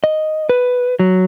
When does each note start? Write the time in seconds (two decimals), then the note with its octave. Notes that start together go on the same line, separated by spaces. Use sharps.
0.04 D#5
0.49 B4
0.99 F#3